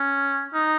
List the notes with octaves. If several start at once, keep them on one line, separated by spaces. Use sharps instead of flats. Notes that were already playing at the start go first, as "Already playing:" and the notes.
Already playing: C#4
D#4